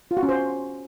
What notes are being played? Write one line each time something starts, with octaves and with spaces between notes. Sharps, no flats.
F4
F#4
C#4
C5